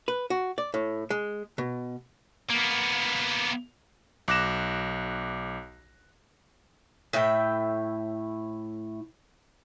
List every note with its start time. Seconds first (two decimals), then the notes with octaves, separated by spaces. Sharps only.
0.08 B4
0.30 F#4
0.58 D5
0.74 A2
1.10 G#3
1.58 B2
2.50 A#3 B3
4.28 B1 D6 F#6 A#6 E7
7.13 A2 E4 E5 G5